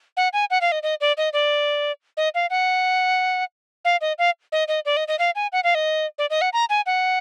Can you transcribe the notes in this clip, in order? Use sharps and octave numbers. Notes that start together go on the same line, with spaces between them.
F#5
G#5
F#5
F5
D#5
D#5
D5
D#5
D5
D#5
F5
F#5
F5
D#5
F5
D#5
D#5
D5
D#5
D#5
F5
G#5
F#5
F5
D#5
D5
D#5
F#5
A#5
G#5
F#5